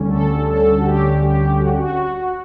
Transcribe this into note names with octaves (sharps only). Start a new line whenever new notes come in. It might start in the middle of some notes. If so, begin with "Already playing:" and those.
Already playing: D2 D3 G3 C#4
A4
A4
F#4
G4
G4
F#4
G4
F#4